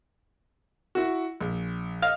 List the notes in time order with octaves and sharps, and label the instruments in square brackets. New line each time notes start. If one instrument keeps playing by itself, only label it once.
[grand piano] E4 F#4
A#1
[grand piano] D#5 [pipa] F5